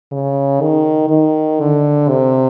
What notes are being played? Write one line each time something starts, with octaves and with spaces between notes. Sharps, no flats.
C#3
D#3
D#3
D3
C3